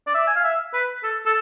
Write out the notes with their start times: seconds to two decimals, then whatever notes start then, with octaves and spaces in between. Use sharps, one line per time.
0.07 D5
0.14 E5
0.27 G#5
0.35 F5
0.44 E5
0.73 B4
1.03 A4
1.26 A4